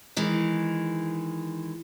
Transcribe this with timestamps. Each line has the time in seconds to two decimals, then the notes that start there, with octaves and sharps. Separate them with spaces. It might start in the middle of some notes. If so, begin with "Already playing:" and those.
0.16 D#3 E3 G#3